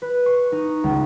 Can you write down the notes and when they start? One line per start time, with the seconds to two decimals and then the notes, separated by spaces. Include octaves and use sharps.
0.02 B4
0.26 C#6
0.52 D#4
0.84 C#2